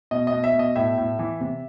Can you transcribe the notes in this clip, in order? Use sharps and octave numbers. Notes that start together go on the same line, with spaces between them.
B2 D#5
D#5
B2
E5
B2
D#5
A2 E5
A2
E3
C3